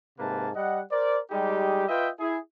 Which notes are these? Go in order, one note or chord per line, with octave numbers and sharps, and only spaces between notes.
G#2 C3 A#3 B4 A5
G3 D#5 F#5
A#4 C5 D5
G3 G#3 D#4 G4
F4 B4 D#5 E5 G5
E4 G#4